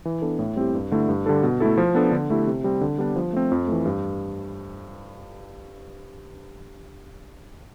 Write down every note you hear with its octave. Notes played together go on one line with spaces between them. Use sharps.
E3
B3 D4 A4
A2
G3 C4 E4 G4
G2
D3 A3 E4
G2
D3 G3 D4 A4
B2
A3 E4 A4
F3
B3 D4 A4
D3
A3 E4 G4
C3
G3 C4
D3
G3 B3 D4
F3
A3 C4
F2
E3 A3
G2